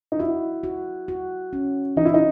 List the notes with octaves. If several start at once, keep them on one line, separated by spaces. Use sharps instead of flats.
D#4
E4 F#4
F#4
F#4
C#4
E3 D#4
E4
D#4